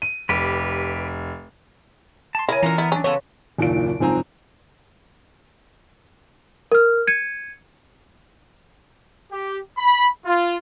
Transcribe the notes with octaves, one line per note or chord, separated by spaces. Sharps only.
D#7
F1 G4 B4
A5 C6
C#3 E4 A#4 G#5
D3 E3 C#4 F4 A#4 A#5
B3 E4
F#3 C#4 D4
C#3 B3 F4 A4 C#5
F#1 D#2 A#2 E4 D7
F#1 G#2 F3 C4 G#5 A#5
A#4 F6
G#6 C#7 D#7
G4
B5
F4